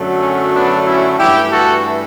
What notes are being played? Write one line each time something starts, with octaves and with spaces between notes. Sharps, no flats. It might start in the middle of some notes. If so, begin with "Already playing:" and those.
Already playing: F#2 D3 F#3 A3
C#4
B3 D4
C#4 E4
G2 E3 A3 E4 G4
F#4 A4